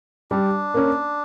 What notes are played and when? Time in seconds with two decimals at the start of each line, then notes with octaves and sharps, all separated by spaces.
0.31 G3 D4
0.74 A#3 C#4